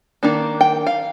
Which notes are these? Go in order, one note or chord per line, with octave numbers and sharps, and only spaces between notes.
D#3 A#3 D4
G5
F5